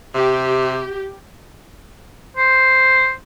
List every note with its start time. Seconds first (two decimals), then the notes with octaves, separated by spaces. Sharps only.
0.14 C3 G4
2.37 C5